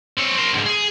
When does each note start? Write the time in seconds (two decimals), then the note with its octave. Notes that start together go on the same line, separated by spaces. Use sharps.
0.17 C4 C#5
0.37 A#4 C5
0.54 D2 G#2
0.66 G#4